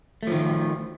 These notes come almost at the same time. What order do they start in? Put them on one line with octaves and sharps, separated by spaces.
A3 F3 D#3